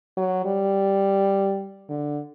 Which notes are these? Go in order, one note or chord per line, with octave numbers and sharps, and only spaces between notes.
F#3
G3
D3